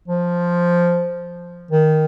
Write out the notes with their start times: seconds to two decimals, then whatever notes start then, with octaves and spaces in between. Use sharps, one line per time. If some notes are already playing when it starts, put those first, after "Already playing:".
0.08 F3
1.71 D#3